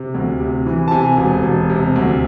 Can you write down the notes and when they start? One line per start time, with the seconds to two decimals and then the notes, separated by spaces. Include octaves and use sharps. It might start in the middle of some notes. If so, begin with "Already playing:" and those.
Already playing: C3
0.14 D2
0.40 C3
0.66 E3
0.88 A5
0.91 C3 G#5
1.17 E1
1.43 E1
1.69 C3
1.96 D2